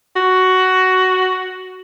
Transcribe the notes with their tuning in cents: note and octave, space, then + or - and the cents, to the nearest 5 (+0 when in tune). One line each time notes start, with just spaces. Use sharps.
F#4 +10